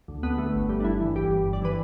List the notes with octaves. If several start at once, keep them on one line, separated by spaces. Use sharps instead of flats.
D2
D3 B3
A3
G1
G3
D4
G2 E4
E3
G1 G4
G3
G2
D5
E3 B4